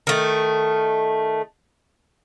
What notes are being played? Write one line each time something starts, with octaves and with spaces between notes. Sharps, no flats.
D#3 A3